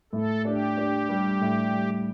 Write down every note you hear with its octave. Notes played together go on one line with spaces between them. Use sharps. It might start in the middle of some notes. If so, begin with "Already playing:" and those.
A2 A4
D4 G4
D4
G3
A2
G3